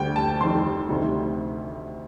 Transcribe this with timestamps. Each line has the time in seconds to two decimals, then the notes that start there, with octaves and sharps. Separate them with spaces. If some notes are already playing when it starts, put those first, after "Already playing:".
Already playing: D2 D3 G3 G5
0.16 A5
0.40 F1 F2 D#3 G3 C6
0.89 D2 C3 D#3 G3